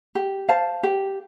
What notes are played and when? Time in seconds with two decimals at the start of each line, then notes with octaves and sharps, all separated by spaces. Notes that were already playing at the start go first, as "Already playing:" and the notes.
0.15 G4
0.49 C5 F5 A5
0.83 G4